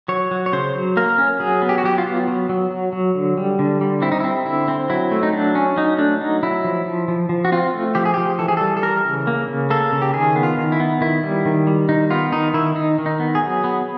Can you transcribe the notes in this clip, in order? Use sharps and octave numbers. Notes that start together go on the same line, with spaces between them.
F#3 C#5
F#3
C#5
C#3 C5
F#3
A#3 A#4
C#4
F#3 G#4
B3
G4
F#4
F#3 G4
F4
B3
F#3
F#3
F#3
F#3
D3
G3
D3
G3
C4 E4
D#4
C4 E4
D3 E4
C4
F#3 E4
A3
D#4
F#3 D4
C#4
F#3 D#4
A3 D4
F#3 D#4
F#3 E4
F3
F3
F3
F3
F#4
C4 F4
A3
F3 G4
G#4
F3 G4
E3 A4
G#4
G3 A4
A4
E3 A#4
C#3
A#3
C#3
A#3 A4
C#3
G4
D#3 G#4
B3
F4
D#3
E4
B3
D#3 E4
G3
D#3
G3
D#3 D#4
B3 F4
D#3 D#4
D#3 E4
D#3 D#4
D#3
D#4
B3
G#4
F#3
B3